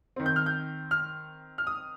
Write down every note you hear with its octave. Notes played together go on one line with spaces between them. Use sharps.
D#3 C4
G6
F6
G6
F6
F6
D#6